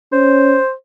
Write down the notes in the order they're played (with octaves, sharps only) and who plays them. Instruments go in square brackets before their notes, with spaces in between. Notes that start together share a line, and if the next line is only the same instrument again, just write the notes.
[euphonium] C#4 [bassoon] C5